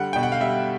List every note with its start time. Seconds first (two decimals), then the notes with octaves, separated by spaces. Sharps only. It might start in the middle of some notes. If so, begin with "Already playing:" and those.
Already playing: D3 G3 F#5
0.13 B2 G5
0.23 F#5
0.32 F5
0.40 G3 E5